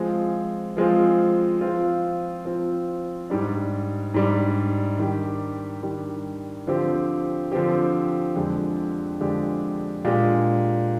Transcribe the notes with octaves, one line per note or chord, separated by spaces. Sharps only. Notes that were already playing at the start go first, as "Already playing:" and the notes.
Already playing: F3 G#3 C4 F4
F3 G#3 C4 F4
F3 C4 F4
F3 C4 F4
G#2 G3 D4
G#2 G3 D4
D#3 G3 D4 G4
D#3 G3 D4 G4
D3 F3 C4 G4
D3 F3 C4 G4
F2 D3 G#3 D4 G4
F2 D3 G#3 D4 G4
A#2 G#3 D4 G4